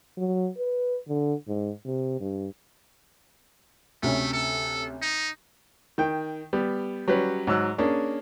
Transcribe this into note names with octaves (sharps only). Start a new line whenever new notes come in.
F#3
B4
D3
G#2
C3
G2
D2 C3 A3 C#4
A4
D#4
D#3 G5
G3 B3
F#3 G3 C#4 B4
G#2 F#3 E6 F#6
A#3 C#4 D4 G#4